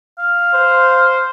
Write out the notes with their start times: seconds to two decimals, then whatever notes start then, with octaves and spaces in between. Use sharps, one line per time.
0.19 F5
0.54 C5